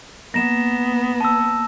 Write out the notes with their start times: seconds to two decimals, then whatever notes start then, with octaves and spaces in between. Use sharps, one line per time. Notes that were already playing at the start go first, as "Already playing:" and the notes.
0.34 A#3 B3 A#6 E7
1.21 A5 E6